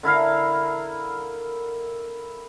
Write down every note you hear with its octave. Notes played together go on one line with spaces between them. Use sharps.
D3 E4 A#4 F5